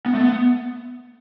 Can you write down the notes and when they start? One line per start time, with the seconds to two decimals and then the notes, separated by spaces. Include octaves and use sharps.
0.06 B3
0.15 A3
0.21 B3